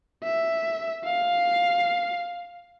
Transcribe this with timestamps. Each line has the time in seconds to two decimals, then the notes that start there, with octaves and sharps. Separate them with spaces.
0.24 E5
1.04 F5